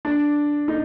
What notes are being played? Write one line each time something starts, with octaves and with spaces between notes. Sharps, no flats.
D4
D#4